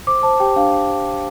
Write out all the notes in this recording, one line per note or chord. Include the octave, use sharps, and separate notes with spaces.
C5 D6
C5 A5
G4 G5
D4 F5